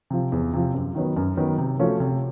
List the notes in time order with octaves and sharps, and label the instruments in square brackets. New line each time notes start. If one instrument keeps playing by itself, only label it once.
[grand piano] C3 F3
E2
C3 F3
F#2
D#3 F#3 B3
F#2
D#3 F#3 B3
C3
F3 A3 C#4 F#4
C3